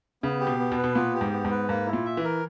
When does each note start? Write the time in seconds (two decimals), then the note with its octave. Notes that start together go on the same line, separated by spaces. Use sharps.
0.23 C#3 B3
0.41 G4
0.47 B2
0.59 B3
0.72 B2
0.78 B4
0.84 B2
0.95 A#2 B3
1.15 G4
1.21 G#2
1.32 B3
1.45 G#2
1.51 B4
1.69 G#2 A#3
1.87 E4
1.93 A#2
2.05 E5
2.17 E3
2.24 A#4